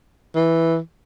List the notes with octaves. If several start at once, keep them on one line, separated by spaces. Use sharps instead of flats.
E3